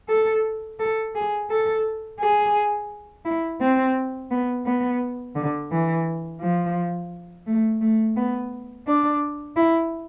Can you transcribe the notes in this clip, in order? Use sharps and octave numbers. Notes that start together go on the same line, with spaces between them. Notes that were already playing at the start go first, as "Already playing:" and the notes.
A4
A4
G#4
A4
G#4
E4
C4
B3
B3
D3
E3
F3
A3
A3
B3
D4
E4